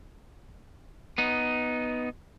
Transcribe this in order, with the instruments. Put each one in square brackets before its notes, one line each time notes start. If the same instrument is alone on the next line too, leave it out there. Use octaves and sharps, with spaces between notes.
[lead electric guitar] B3 D#4